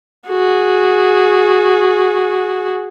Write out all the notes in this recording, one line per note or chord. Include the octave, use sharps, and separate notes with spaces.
F#4 G#4